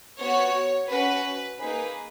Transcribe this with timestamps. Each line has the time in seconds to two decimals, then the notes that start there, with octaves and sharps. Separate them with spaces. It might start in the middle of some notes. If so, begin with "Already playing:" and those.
0.21 B3 F#4 C#5
0.91 C#4 F#4 B4
1.60 A#3 D#4 G#4 B4